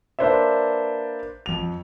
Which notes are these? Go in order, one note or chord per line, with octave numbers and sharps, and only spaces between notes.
A#3 D4 B4 C5 D5 E5
F2 F7